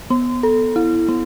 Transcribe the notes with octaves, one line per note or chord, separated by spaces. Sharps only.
B3
A4
E4
B3